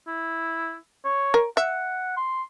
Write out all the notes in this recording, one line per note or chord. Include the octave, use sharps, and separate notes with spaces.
E4
C#5
A#4
E5 F#5
C6